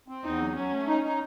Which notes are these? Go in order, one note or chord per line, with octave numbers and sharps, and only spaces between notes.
C4
E2 D#4
F#3
F#3 C#4
A3
D#4
D#4